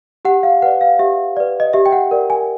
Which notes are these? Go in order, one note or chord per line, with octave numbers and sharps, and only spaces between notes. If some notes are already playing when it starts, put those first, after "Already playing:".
G4 F#5
F5
B4 D5 F#5
F5
G4 E5
B4 D5
D#5
G4 E5
G5
F#5
A#4 D5
G#5